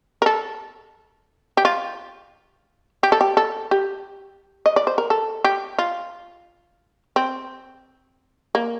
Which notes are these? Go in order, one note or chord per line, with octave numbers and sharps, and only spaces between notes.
A#4
A4
G4
F4
G4
A4
G4
A4
G4
D#5
D5
C5
A#4
A4
G4
F4
C4
A#3